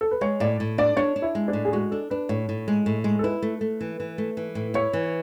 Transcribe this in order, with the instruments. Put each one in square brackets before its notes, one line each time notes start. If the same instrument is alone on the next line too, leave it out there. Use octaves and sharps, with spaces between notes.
[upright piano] A4
B4
[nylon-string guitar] G#3 [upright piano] C#5
[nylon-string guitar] A2 [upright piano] D5
[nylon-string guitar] A2
[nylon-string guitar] D4 [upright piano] D5
[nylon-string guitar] D4 [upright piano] C#5
[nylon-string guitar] D4
[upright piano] E4
[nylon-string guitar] G#3
[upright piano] D4
[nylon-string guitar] A2
[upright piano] G#4
[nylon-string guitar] G#3 [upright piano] F#4
[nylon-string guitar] D4 [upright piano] A4
[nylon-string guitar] D4 [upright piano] B4
[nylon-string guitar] A2 [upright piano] C#5
[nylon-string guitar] A2
G#3
A2
G#3
[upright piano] A4
[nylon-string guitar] E4 [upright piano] B4
[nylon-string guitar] A3
A3
E3
E3
A3
E3
A2
[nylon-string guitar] E4 [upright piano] C#5
[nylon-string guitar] E3